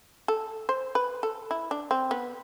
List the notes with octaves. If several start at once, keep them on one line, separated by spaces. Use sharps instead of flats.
A4
C5
B4
A4
E4
D4
C4
B3